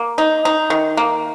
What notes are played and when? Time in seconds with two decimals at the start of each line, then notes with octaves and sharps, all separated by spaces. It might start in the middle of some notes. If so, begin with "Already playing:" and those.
Already playing: A#3
0.18 D#4
0.45 D#4
0.70 D#3
0.97 A#3